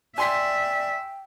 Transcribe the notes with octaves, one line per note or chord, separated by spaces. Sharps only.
D5 E5 G5 G#5 C6 B6